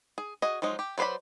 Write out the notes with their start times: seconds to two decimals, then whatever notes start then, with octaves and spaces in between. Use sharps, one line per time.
0.18 G#4
0.42 F#4 G#4 D#5
0.62 F3 F#3 G#3 D#4
0.79 G4
0.98 F#3 B4 C5 D5 B5